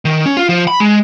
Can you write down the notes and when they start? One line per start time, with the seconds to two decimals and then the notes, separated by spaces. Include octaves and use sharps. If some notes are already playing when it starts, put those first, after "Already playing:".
0.05 D#3
0.26 C#4
0.37 F4
0.49 F3
0.67 B5
0.80 G#3